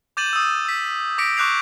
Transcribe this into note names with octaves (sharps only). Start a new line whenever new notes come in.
D6 G6 A6 D#7 E7 F#7
D#6 E6
E6 B6
D6 A#6 B6 C#7 D7
C#6 D6 F#6 G6 C7 F7